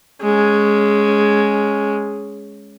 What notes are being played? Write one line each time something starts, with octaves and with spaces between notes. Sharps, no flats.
G#3 C#4